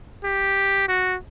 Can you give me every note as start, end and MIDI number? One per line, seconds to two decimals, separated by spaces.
0.24 0.86 67
0.88 1.17 66